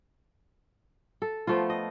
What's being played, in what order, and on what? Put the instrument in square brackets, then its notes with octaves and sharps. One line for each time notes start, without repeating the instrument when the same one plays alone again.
[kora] A4
F3 A3 B3 F4
D#5